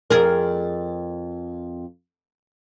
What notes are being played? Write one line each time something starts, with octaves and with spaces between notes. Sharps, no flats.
F2 G#4 A#4